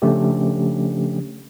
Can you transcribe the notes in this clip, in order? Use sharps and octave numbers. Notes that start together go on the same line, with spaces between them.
C#3 F3 A3 C#4 D4 G4